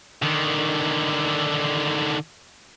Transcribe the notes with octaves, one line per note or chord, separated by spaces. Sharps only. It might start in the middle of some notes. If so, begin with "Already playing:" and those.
D3 D#3